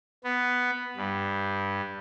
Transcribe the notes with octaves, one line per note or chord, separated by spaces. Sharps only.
B3
G2